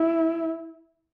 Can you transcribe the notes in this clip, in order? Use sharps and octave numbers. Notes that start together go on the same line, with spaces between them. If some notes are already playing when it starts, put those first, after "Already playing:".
Already playing: E4